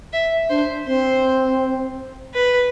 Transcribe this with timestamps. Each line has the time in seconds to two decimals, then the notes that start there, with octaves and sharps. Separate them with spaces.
0.13 E5
0.50 D4 C5
0.86 C4 C5
2.34 B4